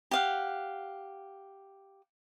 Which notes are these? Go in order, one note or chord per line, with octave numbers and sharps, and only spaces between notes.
G4 F5 F#5